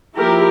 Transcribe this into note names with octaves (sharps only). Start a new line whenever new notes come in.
F3 A#3 E4 G4 A#4